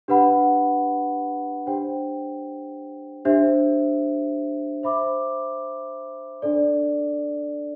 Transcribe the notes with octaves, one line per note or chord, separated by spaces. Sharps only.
D4 G4 B4 F#5 B5
D4 G4 C5 G5
D4 G4 C5 E5
C5 E5 B5 D6
D4 A4 D5